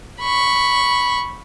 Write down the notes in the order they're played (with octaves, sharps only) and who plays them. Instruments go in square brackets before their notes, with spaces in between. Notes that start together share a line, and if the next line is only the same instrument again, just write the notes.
[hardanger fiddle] B5 C#6